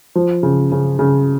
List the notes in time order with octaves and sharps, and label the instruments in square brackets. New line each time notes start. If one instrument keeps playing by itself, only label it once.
[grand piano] F3
C#3
C#3
C#3